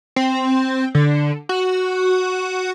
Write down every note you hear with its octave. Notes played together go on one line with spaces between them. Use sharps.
C4
D3
F#4